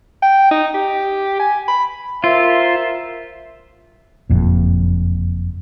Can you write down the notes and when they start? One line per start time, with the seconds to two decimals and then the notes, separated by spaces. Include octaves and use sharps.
0.23 G5
0.51 D#4
0.74 G4
1.39 G#5
1.68 B5
2.24 F4 A#4 C5 E5
4.30 F#1 F2 A#2